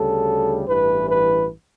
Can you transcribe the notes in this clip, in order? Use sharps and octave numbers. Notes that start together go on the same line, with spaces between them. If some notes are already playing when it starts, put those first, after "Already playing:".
Already playing: D2 C#3 G3 A4
A1 G2 E3 B4
B4